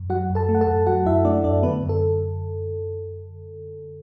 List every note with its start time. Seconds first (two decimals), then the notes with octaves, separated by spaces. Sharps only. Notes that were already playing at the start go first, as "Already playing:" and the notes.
Already playing: F#2
0.10 F#3 F#4 F#5
0.30 F#2
0.35 A4 A5
0.49 A3
0.55 F#5
0.61 A4 A5
0.68 F#2
0.87 F#3 F#4 F#5
1.05 F#2 E4 E5
1.24 A3 D4 D5
1.44 F#2 D4 D5
1.63 D3 B3 B4
1.83 F#2
1.89 A4